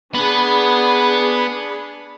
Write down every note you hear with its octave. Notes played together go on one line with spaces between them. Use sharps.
B3 D4 G#4 B5